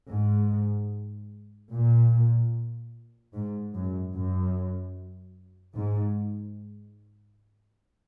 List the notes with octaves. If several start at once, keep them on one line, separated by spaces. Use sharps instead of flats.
G#2
A#2
G#2
F#2
F#2
G#2